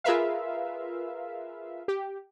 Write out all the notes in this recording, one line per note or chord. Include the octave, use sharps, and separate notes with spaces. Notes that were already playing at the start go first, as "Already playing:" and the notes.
F4 G#4 A#4 B4 E5 F5
G4